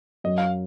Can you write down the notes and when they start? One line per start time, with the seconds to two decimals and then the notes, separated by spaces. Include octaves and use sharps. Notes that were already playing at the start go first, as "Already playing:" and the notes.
0.24 F#2 D#5
0.38 F5